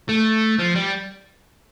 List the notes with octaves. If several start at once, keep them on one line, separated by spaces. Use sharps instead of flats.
A3
F3
G3